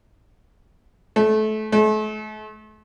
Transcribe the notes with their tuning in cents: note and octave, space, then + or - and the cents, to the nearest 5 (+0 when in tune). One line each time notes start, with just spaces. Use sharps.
A3 -25
A3 -40